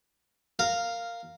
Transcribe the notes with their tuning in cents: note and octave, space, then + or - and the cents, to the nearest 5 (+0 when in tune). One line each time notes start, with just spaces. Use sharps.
A#4 -10 F5 +0